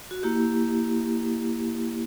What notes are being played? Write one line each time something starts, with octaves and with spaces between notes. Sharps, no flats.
F#4
A#3 E4 G4